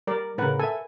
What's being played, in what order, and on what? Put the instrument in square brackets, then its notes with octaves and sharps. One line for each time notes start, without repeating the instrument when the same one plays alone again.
[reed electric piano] G3 [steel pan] A#4 D5
[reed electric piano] A2 C#3 [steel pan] A#4 B4 F#5
[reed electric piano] A4 E5 [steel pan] G#5